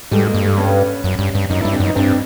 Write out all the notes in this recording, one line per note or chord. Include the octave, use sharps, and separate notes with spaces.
G#2 G3 A3
G#3 A#3
G2
G3 A3
B3 C#4
F#2
G2
G2
F#2 C#4 D#4
G2 D4 E4
C4 D4
F#2 C#4 D#4
G2 C4 D4